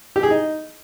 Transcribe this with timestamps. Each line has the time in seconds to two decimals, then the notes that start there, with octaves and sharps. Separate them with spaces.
0.16 G4
0.23 G#4
0.30 D#4